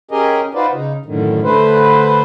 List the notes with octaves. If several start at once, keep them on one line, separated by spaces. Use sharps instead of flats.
C#4 G4 G#4 A#4 D#5
D#4 F4 F#4 B4 C5 D5
C#3 D#4
F#2 A2 D3 D#3
D3 A3 B4 C5